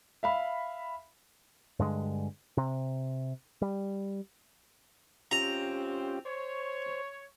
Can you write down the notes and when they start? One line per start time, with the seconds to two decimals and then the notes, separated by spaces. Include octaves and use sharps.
0.23 E5 F5 B5
1.79 G2 D3 G#3
2.57 C3
3.62 G3
5.31 C4 C#4 F4 G4 A#5
6.25 C5 C#5